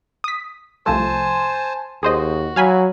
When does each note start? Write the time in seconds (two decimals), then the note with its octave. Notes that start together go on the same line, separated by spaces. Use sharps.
0.24 D#6 B6
0.86 C2 F3 A3 C5 G#5 A5
2.03 D#2 F#4 G#4 C5 D#5
2.56 F#3 F5 G#5 B5